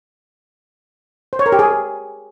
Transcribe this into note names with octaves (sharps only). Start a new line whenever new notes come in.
C5
C#5
A#4
G4
G#4